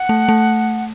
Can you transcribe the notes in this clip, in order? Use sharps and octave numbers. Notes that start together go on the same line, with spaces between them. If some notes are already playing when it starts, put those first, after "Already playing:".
Already playing: F#5
A3
A3